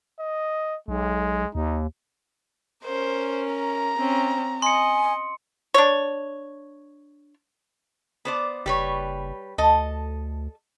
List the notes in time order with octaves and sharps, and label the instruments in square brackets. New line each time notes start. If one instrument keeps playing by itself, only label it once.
[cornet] D#5
[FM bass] B1 [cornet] G#3
[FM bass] D#2 [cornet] D#4
[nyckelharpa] C#4 A#4 [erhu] C5
[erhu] A#5
[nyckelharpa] C4 C#4
[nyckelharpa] D#5 [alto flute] G#5 [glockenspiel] C6 C#7
[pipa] D4 C#5
[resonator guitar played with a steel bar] B3 C5 D5
[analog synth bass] F#1 [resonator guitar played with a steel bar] G3 B4 C#5
[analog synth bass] D2 [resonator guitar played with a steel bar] A4 D#5